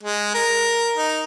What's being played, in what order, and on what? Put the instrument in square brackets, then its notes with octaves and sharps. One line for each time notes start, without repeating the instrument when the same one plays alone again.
[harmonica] G#3
A#4
D#4